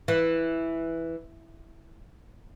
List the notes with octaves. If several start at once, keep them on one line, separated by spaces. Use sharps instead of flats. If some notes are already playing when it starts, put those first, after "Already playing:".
E3